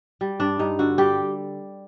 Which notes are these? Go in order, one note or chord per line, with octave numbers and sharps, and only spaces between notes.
G3
G2 D4
G2 D#4
D3 F#4
G3 G4